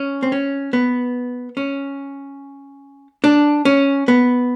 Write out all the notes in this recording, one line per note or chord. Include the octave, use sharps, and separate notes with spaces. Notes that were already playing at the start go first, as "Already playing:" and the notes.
Already playing: C#4
C4
C#4
B3
C#4
D4
C#4
B3